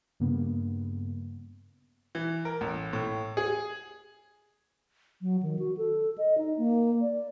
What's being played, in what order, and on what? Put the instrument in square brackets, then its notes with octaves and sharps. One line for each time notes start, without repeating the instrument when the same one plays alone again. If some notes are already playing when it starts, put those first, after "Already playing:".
[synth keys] G2 C#3 A#3 B3
[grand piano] E3
A#4
A1
A2
G#4
[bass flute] F#3
D#3
F#4
A4
D#5
D#4
A#3
D5